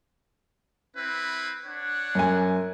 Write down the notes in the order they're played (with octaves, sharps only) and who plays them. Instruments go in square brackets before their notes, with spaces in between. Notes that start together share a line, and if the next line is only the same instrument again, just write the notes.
[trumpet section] C4 E4 B4
D4 C#5 F#5
[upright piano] F#2 G#5